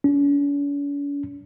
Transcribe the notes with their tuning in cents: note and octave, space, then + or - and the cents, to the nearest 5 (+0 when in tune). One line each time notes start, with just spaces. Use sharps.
C#4 +45